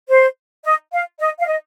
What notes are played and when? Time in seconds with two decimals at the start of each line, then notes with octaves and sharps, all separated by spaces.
0.09 C5
0.65 D#5
0.93 F5
1.20 D#5
1.40 F5
1.47 D#5